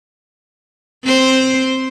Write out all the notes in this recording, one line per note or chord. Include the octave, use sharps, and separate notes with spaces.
C4 C5